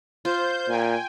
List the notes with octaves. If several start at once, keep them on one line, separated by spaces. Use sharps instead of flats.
F4 C5 G6
A#2 G5 G#5